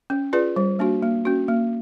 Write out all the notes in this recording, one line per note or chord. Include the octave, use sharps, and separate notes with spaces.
C#4
F4 G#4 B4 D5
G3
A#3 D4 F#4
A#3
C#4 F#4
A#3